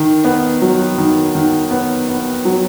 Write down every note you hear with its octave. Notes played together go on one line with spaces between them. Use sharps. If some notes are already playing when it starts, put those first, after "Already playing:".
Already playing: D#3
B3
F#3
D#3
D#3
B3
B3
F#3